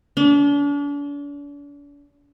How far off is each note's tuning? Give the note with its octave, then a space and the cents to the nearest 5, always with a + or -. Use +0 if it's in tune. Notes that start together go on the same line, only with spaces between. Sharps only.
D4 -40